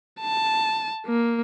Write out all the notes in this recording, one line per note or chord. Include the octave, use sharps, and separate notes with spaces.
A5
A#3